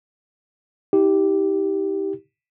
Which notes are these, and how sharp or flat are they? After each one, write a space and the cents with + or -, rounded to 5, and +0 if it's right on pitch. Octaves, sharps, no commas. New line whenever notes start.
D#4 +45 G4 -5